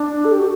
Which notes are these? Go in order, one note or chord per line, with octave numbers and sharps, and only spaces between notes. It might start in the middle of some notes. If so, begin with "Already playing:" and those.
Already playing: D4
A4
G4
F#4